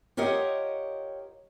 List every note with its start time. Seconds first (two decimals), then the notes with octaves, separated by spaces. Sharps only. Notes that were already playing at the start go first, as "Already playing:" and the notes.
0.17 F4 G4 A#4 C#5 D#5 F#5